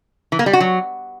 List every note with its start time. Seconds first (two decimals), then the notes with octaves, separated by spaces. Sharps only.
0.32 E3
0.39 A#3
0.46 G3
0.53 F#4
0.60 F#3